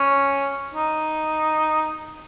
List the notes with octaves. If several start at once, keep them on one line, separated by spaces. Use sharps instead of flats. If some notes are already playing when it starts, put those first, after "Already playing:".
Already playing: C#4
D#4